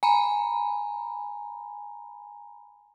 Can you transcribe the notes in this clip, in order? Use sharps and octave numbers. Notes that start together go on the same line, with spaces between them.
G#5 A#5 B5